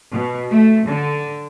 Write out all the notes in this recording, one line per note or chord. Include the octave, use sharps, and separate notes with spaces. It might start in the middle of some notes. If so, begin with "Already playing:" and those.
B2
A3
D3